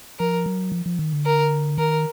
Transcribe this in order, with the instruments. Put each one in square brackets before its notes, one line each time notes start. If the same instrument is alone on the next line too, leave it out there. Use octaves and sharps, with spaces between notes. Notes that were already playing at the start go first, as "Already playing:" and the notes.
[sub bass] F3 [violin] A#4
[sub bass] F#3
F3
F3
D#3
D3
[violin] A#4
[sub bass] D#3 [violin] A#4